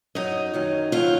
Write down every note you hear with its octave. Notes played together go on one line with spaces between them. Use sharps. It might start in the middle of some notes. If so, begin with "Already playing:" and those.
F#2 D#3 F#3 D#4 D#5
F#2 D#3 F#3
F2 D#3 F#3 F4 F5